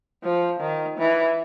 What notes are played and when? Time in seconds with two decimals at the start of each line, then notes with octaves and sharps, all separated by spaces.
0.23 F3
0.60 D#3
0.98 E3